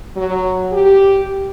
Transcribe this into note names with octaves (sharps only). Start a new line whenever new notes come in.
F#3
G4